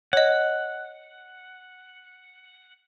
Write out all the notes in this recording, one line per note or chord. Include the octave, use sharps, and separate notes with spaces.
C#5 D#5 F#5